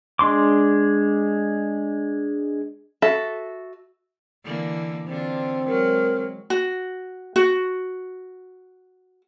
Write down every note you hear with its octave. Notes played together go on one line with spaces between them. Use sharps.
G#3 D4 C6 D6
F#4 A4 E5
D3 E3 A#3
D3 C4 F4
F#3 G#3 A#4
F#4
F#4